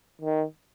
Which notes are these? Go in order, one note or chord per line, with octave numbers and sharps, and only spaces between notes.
D#3